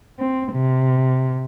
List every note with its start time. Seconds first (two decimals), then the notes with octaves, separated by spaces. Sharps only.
0.18 C4
0.53 C3